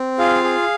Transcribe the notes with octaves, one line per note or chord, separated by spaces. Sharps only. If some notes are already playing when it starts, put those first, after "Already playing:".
Already playing: C4
F4 G#4 F5
G#4